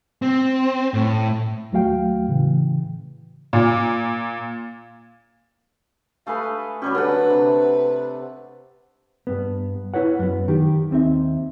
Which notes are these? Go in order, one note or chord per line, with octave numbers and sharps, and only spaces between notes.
C4
A2
D#2 F#3 A3 F#4 F5 G5
A2 C#3 E3
A#2
A3 G#4 B4 F5
F#3 G3 C#4 G4
D3 B4 F#5
C3
G2 B3
E4 B4 C#5 F#5
F#2 B3
D#3 G4
D#2 C4 D#4 E5